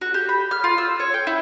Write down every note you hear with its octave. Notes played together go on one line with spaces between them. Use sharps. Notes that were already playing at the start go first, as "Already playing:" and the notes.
F#4
G4
B5
F6
F4
E6
C#5
G5
E4